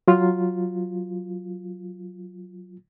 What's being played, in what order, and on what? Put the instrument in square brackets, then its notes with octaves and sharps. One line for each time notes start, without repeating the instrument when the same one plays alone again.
[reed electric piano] F#3 F4